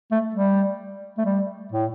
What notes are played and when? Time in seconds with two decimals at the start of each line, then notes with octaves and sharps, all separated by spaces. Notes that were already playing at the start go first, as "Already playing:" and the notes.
0.11 A3
0.34 G3
1.18 A3
1.25 G3
1.72 A2